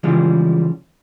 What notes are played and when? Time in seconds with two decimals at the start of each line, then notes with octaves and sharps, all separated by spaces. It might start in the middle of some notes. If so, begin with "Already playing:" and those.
0.03 C#3 E3 F3 G3 G#3